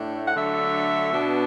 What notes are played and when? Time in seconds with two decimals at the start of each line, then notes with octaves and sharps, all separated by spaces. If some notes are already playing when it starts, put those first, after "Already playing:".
Already playing: A2 A3 D4
0.27 F#5
0.36 D3 F#3 A3 D4 E5
1.12 B2 B3 D4